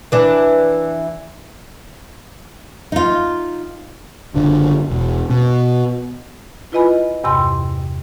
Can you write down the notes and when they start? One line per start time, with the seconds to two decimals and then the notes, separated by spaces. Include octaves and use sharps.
0.12 E3 D4
2.92 D#4 F4
4.34 F#1 D3
4.90 E1
5.30 B2
6.72 E4 F4 B4 D#5 G#5 B5
7.24 E2 G2 C3 G5 C6